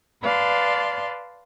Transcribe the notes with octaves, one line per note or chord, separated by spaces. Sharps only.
B4 D5 F5 A5 C6